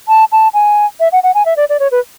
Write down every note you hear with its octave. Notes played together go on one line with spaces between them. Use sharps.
A5
A5
G#5
E5
F#5
F#5
G#5
E5
D5
D5
C#5
B4